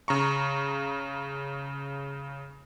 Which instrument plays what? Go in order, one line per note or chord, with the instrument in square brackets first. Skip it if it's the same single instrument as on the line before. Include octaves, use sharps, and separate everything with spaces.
[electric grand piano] C#3 A#5 C#6